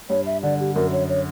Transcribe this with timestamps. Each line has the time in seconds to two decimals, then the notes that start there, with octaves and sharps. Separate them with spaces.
0.10 G2 C#5
0.26 E5
0.43 D3 D5
0.60 G4
0.75 F#2 A#4
0.92 C#5
1.09 C#5